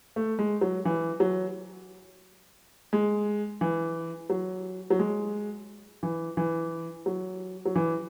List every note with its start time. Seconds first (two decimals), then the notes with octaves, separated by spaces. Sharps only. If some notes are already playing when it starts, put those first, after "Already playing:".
0.16 A3
0.39 G#3
0.61 F#3
0.85 E3
1.20 F#3
2.93 G#3
3.61 E3
4.30 F#3
4.90 F#3
4.99 G#3
6.03 E3
6.37 E3
7.06 F#3
7.65 F#3
7.76 E3